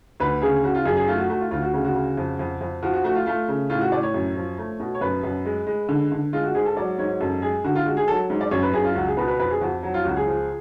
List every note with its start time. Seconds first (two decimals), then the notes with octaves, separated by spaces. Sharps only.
0.20 D2 B4
0.42 C#3 G#4
0.63 C#3 F#4
0.75 F4
0.86 F#2 G#4
0.97 G#4
1.08 A3 F4
1.18 F#4
1.29 A3 F#4
1.40 F4
1.51 D2 F4
1.62 F#4
1.73 C#3 F#4
1.85 F#4
1.95 C#3
2.17 F2
2.39 F2
2.61 F2
2.83 F3 F#4
2.94 F#4
3.04 A3 F#4
3.15 F4
3.26 A3 F4
3.48 C#3
3.70 A2 F4
3.81 F#4
3.92 A2 D5
4.03 C#5
4.14 F#2
4.36 F3
4.58 A3
4.80 B2
4.95 C#5
5.01 F#2 B4
5.24 F#2
5.45 G#3
5.67 G#3
5.89 D3
6.12 D3
6.33 G#3 F4
6.44 F#4
6.55 G#2 G#4
6.66 A4
6.77 F#3 D5
6.98 G#2 C#5
7.20 F#2 A4
7.42 G#3 G#4
7.64 D3 F#4
7.76 F4
7.86 G#3 F#4
7.97 G#4
8.08 F#3 A4
8.30 G#2
8.41 D5
8.51 F#2 C#5
8.63 B4
8.74 F#2 G#4
8.84 F4
8.95 C#2 F#4
9.07 G#4
9.17 B2 B4
9.28 B4
9.39 F2 B4
9.51 G#4
9.61 F2 F#4
9.83 F#3 F#4
9.94 F4
10.05 C#2 F#4
10.16 G#4
10.27 F3